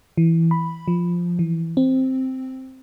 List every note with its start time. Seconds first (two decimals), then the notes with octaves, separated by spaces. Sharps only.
0.17 E3
0.51 B5
0.88 F3
1.39 E3
1.77 C4